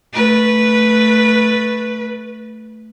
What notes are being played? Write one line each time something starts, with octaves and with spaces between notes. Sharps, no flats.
A3 B4